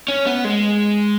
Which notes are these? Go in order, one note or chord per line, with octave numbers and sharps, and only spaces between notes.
C#4
B3
G#3